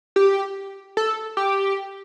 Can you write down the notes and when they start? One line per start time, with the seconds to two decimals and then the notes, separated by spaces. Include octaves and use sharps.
0.16 G4
0.97 A4
1.37 G4